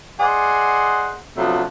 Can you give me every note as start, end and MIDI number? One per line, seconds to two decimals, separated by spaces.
0.20 1.16 68
0.20 1.16 72
0.20 1.16 74
0.20 1.16 75
0.20 1.16 78
1.36 1.62 48
1.36 1.62 53
1.36 1.62 54
1.36 1.62 57
1.36 1.62 59
1.36 1.62 62